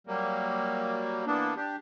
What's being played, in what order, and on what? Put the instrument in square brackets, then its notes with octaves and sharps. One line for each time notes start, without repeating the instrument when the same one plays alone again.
[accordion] F#3 G3 A#3
E3 A#3 B3 D4
D4 G4